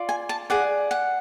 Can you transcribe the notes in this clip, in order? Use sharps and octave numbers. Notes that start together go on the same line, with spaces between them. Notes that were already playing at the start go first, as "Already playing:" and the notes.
Already playing: F4 D5
G#5
A5
G#4 D5 F#5
F#5